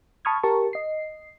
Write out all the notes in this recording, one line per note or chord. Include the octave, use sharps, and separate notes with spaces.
A5 B5 C#6 D#6 F6 G#6
G4 A#4 A5 C#6
D#5 C7